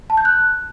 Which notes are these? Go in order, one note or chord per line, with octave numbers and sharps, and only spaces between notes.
A5
G6
F#6